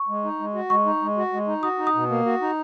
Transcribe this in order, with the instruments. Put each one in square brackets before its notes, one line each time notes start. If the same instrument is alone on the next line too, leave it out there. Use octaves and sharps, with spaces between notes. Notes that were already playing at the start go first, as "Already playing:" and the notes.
Already playing: [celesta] C#6
[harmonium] G#3
D#4
G#3
F#4
[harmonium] G#3 [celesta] C#6
[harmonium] D#4
G#3
F#4
G#3
D#4
[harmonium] F#4 [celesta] D#6
[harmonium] D#4
[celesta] D#6
[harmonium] B2
A#3
F#4
D#4